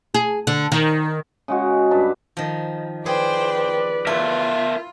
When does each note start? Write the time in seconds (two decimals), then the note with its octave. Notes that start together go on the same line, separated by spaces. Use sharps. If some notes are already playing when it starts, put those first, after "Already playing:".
0.14 G#4
0.47 D3
0.72 D#3
1.48 C#3 G#3 F#4
1.91 G2 B4 D5 A5
2.37 D#3 F3
3.06 G#4 B4 C5 D5 G5
4.07 E4 F4 A#4 E5 A5